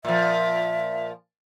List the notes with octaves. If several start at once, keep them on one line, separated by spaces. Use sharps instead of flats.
A#2 F3 E5